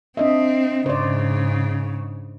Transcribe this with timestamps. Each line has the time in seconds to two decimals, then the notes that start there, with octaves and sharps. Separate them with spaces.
0.17 C4 D4 D#5 E5
0.86 G#2 C#3 C5 D5